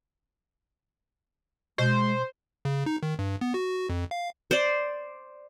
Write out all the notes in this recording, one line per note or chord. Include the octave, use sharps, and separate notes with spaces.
B2 G#3 C5
C#3
D#4
D#3
G2
B3
F#4
F2
F5
C5 D5